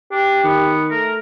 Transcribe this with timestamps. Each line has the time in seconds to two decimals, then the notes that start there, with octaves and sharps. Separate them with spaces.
0.12 D4 G4
0.44 D#3 B3
0.90 A3 A#4